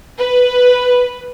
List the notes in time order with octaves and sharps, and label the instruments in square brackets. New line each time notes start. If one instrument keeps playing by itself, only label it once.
[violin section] B4